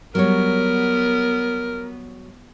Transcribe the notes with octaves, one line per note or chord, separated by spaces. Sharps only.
F#3 G3 B3 A#4 C#5